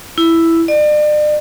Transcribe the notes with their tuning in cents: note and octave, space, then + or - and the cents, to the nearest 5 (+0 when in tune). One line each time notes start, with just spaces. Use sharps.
E4 +5
D5 +40